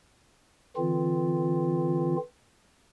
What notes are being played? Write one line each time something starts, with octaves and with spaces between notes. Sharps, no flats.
D3 E3 C4 F4